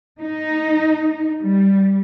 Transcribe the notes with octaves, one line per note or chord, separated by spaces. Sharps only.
D#4
G3